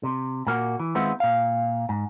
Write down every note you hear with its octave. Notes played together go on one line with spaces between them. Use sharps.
C3
A#2 A#3 F#4
E3
D#3 G#3 B3 C4 E4 F4
A#2 F5
G#2